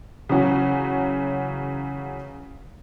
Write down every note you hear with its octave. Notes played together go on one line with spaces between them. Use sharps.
C#3 E3 F#3 C#4 F#4